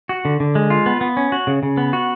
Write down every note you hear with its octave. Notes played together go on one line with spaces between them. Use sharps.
F#4
D3
D3
G#3
F4
B3
B3
C#4
F#4
C#3
C#3
B3
F#4